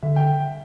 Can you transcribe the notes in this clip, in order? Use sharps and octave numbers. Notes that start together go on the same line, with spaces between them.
D3 E5
G5